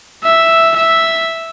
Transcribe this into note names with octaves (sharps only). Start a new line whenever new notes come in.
E5
E5